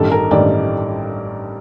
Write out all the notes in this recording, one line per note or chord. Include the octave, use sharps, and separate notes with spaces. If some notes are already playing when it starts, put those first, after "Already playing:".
Already playing: A1 G2 D#3 G3 A4
A#4
A1 G2 D#3 G3 D5